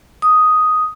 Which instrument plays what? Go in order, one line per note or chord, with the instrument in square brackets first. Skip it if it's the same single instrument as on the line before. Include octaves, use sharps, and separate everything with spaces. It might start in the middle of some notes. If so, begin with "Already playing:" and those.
[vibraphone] D#6